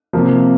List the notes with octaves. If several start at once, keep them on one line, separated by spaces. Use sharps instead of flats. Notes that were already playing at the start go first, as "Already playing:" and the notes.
C3 F3 A#3